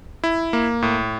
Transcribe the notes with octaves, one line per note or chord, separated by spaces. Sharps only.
E4
A#3
A2